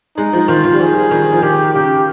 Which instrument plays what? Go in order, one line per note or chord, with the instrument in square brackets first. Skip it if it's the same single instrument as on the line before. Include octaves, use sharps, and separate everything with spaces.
[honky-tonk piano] G#3 [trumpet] D#4
[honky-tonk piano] F3
[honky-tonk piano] D#3 [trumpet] F4
[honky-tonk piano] D#3
G3
[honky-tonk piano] F3 [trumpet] G#4
[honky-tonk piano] D#3
F3
[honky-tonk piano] D#3 [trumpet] G4
[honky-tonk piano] C#3 [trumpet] G4